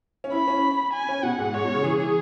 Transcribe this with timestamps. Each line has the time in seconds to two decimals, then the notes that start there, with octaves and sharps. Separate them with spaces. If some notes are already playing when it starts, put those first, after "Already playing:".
0.24 C#4
0.32 E4 B5
0.48 C#4
0.93 G#5
1.09 C#4
1.23 B2 F#5
1.38 G#2
1.54 G#2 C#5
1.64 B2
1.74 C#3
1.84 E3 G#4
1.99 E3